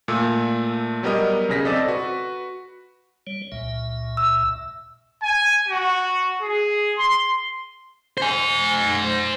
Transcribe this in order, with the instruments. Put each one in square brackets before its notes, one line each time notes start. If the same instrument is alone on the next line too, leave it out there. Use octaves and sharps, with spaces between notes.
[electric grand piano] A#2 A3 E6
F#3 G3 B3 A#4 D#5
B1 C#3 G#4 A#6 B6
C4 A4 D5 D#5
F#4 B4
[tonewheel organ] G3 C#5
C#2 A#2 E5
[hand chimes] E6
[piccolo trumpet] G#5
F#4
G#4
C6
[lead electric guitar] C5 G#5